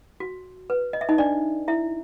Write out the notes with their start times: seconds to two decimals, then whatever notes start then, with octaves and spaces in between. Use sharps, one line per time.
0.20 F#4
0.70 B4
0.93 D#5
1.01 E5
1.09 D#4 D#5
1.18 D4 D5
1.68 E4 E5